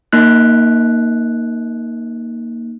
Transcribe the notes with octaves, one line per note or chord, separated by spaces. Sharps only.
A#3 D#4 F#6